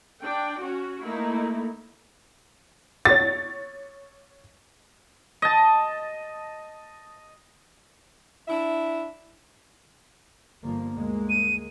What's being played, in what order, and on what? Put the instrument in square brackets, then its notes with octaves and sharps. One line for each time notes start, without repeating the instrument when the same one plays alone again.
[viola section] D4 G5
C#4 F#4
A3 A#3 D#4 E4
[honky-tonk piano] C#5 A6
[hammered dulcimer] D#5 A5
[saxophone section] D4 E4 E5
[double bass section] G1 F3 A#3
D2 G#3 A#3
[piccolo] D#7